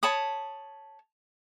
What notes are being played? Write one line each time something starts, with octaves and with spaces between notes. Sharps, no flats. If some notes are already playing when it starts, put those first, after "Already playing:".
C#5 A5 B5 D#6